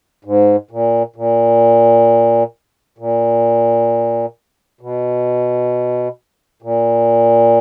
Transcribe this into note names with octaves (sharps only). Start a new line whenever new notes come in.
G#2
A#2
A#2
A#2
B2
A#2